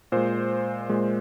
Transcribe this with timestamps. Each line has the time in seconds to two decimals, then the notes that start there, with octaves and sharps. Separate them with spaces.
0.12 A#2 G#3 C5
0.89 A#2 G#3